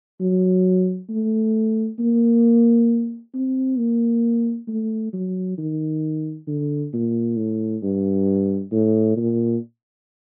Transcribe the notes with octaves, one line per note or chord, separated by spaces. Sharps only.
F#3
A3
A#3
C4
A#3
A3
F#3
D#3
D3
A#2
A2
G2
A2
A#2